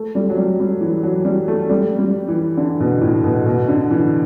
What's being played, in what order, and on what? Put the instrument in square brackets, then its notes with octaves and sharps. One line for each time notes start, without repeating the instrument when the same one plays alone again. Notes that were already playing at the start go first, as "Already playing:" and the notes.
Already playing: [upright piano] A3
G3
F#3
G3
G3
E3
F#3
G3
A3
G3
G3
E3
D3
B2
A2
B2
B2
D3
E3